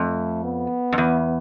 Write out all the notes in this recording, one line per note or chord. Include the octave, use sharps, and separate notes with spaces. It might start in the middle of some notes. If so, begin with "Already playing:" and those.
Already playing: F2 A3
B3
F2
E2